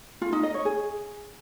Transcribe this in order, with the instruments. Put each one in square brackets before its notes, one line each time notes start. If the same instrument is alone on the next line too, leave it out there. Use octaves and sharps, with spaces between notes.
[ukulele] F4
D#4
D#5
C#5
G#4